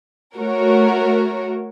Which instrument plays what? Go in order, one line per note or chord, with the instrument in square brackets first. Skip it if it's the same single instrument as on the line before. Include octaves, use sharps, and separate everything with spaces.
[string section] A3 F#4 A#4 C#5